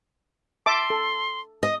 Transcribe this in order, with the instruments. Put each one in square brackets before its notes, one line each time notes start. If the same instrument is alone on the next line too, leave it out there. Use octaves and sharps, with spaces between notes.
[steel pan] E5 A5 D6 [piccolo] C6
[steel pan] A4
[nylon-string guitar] D#5 [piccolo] D#6